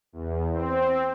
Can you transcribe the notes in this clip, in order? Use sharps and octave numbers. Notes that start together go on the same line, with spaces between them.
E2
C4